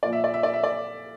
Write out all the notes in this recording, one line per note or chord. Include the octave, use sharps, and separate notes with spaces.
A#2 F3 D5
E5
D5
E5
D5
E5
D5